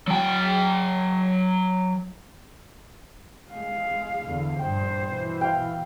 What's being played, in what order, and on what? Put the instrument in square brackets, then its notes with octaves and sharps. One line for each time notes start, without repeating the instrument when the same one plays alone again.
[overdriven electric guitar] F#3 G5
[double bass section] G#3 [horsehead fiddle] F5
[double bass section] E2 D3
[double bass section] A#1 G2 [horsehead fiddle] C5 [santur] G5
[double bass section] B2 E3
[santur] F5 G5